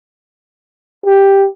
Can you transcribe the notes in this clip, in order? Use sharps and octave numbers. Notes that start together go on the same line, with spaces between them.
G4